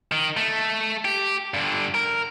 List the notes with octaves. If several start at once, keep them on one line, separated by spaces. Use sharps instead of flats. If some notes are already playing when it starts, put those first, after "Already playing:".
D#3
A3
G4
G2 D3
A#4